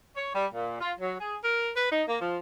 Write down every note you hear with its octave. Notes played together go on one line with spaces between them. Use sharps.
C#5
G3
A#2
F4
F#3
G#4
A#4
B4
D#4
A#3
F3